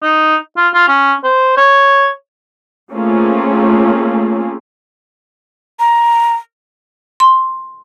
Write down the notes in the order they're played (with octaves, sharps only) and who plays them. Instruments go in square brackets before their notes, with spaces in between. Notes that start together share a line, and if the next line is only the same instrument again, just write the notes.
[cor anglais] D#4
F4
F4
C#4
C5
C#5
[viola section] A3 A#3 C4 C#4 F4 G#4
[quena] A#5
[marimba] C6